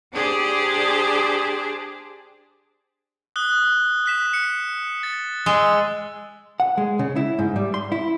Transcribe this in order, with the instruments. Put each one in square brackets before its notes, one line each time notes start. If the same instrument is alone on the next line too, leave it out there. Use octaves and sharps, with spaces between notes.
[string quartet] D4 G4 G#4 C5 D5
[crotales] D#6 F#6 G7
F#6 B6 E7
C#7
A6
[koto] G#3 [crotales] E6
[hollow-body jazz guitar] F#5
G#3
C#3
E4
G#2
G3
C6
E4